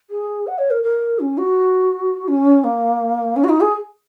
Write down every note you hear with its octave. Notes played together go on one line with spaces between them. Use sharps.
G#4
F#5
C#5
A#4
A#4
C#4
F#4
C#4
A#3
C#4
F#4
D#4
G#4